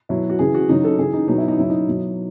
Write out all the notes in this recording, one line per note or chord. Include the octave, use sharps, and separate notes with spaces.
B2 F#3 E4
F#4
C#3 E3 G#4
F#4
C#3 F#3 D#4
A4
C#3 E3 G#4
D#4
B2 F#3 D#4
E4
D#4
C#3 F#3 E4
D#4
B2 F#3